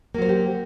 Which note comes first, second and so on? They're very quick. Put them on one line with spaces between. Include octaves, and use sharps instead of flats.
A#3 F#3 C5 F#4 G4